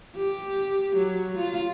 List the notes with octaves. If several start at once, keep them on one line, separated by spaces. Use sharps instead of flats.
G4
F#3
F4